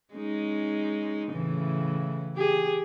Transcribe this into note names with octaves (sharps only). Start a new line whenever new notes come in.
G#3 C#4 D#4
A2 C#3 E3
G4 G#4